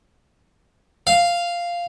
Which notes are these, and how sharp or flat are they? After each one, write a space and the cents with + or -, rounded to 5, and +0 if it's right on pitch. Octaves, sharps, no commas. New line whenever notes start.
F5 -5